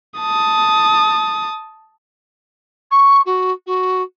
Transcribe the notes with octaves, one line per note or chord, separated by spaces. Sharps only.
A5 D#6
C#6
F#4
F#4